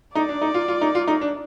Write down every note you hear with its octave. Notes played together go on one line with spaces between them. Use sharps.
D#4 D5
D4
D#4
F4
F4
D#4
F4
D#4
D4